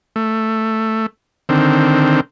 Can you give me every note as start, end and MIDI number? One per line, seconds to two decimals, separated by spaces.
0.16 1.06 57
1.49 2.20 50
1.49 2.20 51
1.49 2.20 60